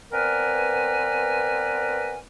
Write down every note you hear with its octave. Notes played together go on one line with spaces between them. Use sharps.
B3 C4 A#4 B4 D5 G#5